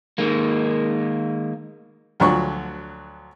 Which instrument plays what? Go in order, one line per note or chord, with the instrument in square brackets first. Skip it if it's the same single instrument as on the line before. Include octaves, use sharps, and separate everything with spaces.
[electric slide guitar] D#3 G#3 A#3
[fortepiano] D2 F3 F#3 D4 C#6